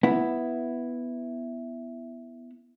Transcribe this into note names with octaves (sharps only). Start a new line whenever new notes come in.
B3 E4